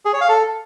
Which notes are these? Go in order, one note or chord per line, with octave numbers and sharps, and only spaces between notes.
G#4
C#5
F5
A4